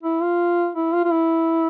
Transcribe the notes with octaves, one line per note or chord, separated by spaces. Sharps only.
E4
F4
E4
F4
F4
E4